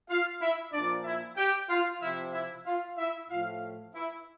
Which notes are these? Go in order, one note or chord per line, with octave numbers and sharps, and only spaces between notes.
F4 F5
E4 E5
A#2 F3 D4 D5
E4 E5
G4 G5
F4 F5
C3 F3 E4 E5
E4 E5
F4 F5
E4 E5
A2 F3 F4 F5
E4 E5